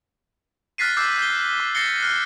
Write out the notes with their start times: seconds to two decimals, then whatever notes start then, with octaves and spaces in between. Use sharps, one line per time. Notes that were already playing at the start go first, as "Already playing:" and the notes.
0.78 F6 F#6 A6 B6 C7 D#7
0.97 D6 E6 G6 C7
1.19 G6 G7
1.60 D6
1.75 A6 A#6 C7 C#7 G7
2.02 F6 F#6